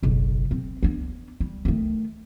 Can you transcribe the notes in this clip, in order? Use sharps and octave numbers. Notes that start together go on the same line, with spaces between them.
F#1 B1
C4
B3 D4
G3
D#3 A3